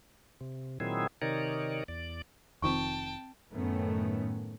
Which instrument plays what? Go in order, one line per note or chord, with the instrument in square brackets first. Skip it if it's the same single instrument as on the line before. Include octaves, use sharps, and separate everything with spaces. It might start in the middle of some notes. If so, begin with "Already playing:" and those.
[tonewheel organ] C3
A#2 D#3 F#3 C4 E4 G#4
C3 D#3 D#4 A#4 C#5 D5
E2 D5
[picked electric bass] F1 D#3 F3 [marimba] C4 C#6 [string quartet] G5 A5
[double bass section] F#2 A2 D#3 A3 B3 C#4